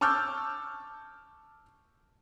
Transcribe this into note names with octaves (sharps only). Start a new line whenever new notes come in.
A5 C#6 D6 E6 F6 G6